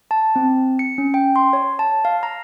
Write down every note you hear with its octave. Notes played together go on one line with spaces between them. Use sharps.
A5
C4
C#7
C#4
G5
C6
C#5
A5
F5
A#5